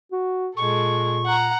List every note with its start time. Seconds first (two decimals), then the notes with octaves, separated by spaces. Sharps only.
0.12 F#4
0.57 A#2 G#3 A4 C#6
1.25 F#5 A#5